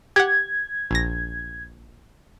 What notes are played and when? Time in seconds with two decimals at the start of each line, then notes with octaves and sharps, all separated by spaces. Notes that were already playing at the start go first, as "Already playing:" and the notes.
0.16 G4 F#5 G#6
0.91 A#1 A#6